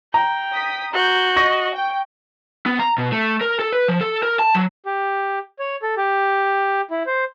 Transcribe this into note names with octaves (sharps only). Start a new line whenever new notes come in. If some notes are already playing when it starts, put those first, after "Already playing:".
G5 A#5
D#6 B6
F#4 G6
D#5 C#6 A#6
G5
B3
A#5
B2
A3
A#4
A4
B4
F3
A4
A#4
A5
F#3
G4
C#5
A4
G4
E4
C5